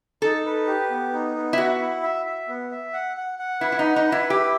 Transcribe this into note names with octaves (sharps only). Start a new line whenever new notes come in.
D#4 A4
B4
G4
B3
D#4
B3
E4
F#4 E5
E4
E5
E5
B3
E5
F#5
F#5
F#5
E4 B4
E4
D#4
F#5
D#4
B4
E4
E4 G4